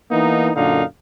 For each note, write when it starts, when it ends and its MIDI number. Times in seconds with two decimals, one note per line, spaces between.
0.11 0.49 52
0.11 0.49 58
0.11 0.49 59
0.11 0.49 63
0.55 0.82 42
0.55 0.82 46
0.55 0.82 50
0.55 0.82 63
0.55 0.82 77